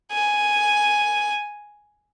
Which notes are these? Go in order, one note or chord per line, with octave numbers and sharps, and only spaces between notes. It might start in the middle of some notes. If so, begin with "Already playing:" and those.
G#5